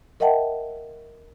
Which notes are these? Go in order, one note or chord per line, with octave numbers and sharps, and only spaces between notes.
A#4 D#5 E5 F#5 G5 A5